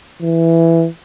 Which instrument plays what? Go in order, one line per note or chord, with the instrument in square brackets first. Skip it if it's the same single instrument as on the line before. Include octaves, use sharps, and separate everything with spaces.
[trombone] E3